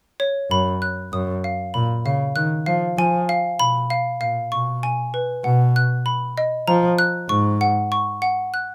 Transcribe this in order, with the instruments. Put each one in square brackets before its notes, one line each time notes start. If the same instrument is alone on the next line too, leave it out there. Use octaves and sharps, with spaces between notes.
[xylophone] C#5
[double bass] F#2 [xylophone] B5
[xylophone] F#6
[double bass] F#2 [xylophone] D#6
[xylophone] F5
[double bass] A#2 [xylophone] B5
[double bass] C#3 [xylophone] F5
[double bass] D#3 [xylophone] F#6
[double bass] F3 [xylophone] F5
[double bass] F3 [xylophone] G#5
[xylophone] F5
[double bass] B2 [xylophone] B5
[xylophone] F5
[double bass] A#2 [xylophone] F5
[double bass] B2 [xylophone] C#6
[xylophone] G#5
B4
[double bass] B2 [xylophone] F#5
[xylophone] F#6
B5
D#5
[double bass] F3 [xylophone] A#5
[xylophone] F#6
[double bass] G#2 [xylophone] C#6
[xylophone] F#5
C#6
F#5
F#6